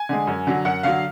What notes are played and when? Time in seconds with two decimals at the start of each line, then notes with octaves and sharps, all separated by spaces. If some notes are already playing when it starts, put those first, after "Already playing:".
Already playing: G#5
0.09 D3 G#3
0.27 F#2
0.47 D3 F#3
0.65 F#2 F#5
0.83 D3 F#3 F5